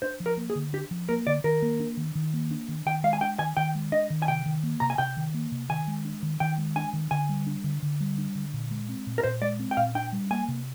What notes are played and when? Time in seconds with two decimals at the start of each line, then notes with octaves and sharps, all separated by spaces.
0.02 D4 C5
0.20 F3
0.26 A#4
0.37 A#3
0.50 G#4
0.56 D3
0.73 D4 G4
0.91 F3
1.09 A#3 A#4
1.27 D3 D5
1.44 D#3 A#4
1.62 A#3
1.80 D4
1.97 D#3
2.15 D#3
2.33 A#3
2.51 D4
2.68 D#3
2.86 D#3 G5
3.04 G#3 F5
3.13 G#5
3.21 D4 G5
3.39 D#3 G#5
3.57 D#3 G5
3.75 G#3
3.92 D4 D#5
4.10 D#3
4.22 G#5
4.28 C3 G5
4.46 D#3
4.63 A#3
4.80 C3 A#5
4.90 G#5
4.98 C3 G5
5.17 D#3
5.34 A#3
5.52 C3
5.69 D#3 G#5
5.88 G#3
6.05 D4
6.23 D#3
6.40 D#3 G5
6.58 G#3
6.76 D4 G#5
6.93 D#3
7.11 D3 G#5
7.29 G3
7.47 D4
7.64 D3
7.83 D3
8.00 G3
8.18 D4
8.35 D3
8.53 A#2
8.71 G#3
8.89 C4
9.07 A#2
9.18 A#4
9.23 A#2 C5
9.42 G#3 D5
9.59 C4
9.71 G5
9.77 A#2 F5
9.95 D4 G5
10.13 G3
10.30 A#3 G#5
10.48 C3